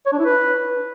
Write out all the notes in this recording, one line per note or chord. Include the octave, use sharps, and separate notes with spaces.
C#5
D4
E4
B4